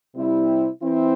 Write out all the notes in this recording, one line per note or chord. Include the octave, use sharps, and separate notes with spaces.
C3 G3 C4 E4
E3 C4 E4